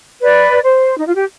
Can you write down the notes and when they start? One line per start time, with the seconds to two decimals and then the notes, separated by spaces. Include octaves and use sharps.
0.22 B4 D5
0.64 C5
0.97 D#4
1.06 F4
1.15 G4